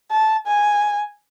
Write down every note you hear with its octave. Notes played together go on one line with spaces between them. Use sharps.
A5
G#5